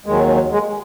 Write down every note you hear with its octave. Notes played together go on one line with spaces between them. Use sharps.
D#2 D#3 F#3 G#3
G#3